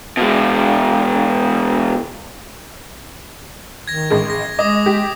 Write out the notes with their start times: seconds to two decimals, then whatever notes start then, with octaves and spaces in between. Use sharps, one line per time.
0.17 B2 G#3
3.88 D#3 G#6 A#6
4.10 A1 G#3
4.30 A#6
4.59 G#3 D#5 D6 D#6
4.86 G4